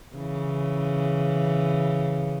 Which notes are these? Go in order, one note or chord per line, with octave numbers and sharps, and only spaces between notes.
C#3 E3